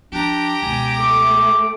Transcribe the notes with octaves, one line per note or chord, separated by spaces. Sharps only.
F3 D4 G4 A#5
C#2 B2 G#5
A3 D6